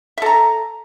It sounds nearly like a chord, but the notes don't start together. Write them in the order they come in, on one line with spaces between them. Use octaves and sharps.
E5 A4 A#5